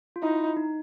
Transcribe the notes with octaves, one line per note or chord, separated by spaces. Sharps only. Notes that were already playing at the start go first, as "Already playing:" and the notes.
F4
D#4 E4
D#4